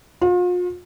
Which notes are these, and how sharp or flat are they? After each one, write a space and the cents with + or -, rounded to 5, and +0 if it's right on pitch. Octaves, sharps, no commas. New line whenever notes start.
F4 +40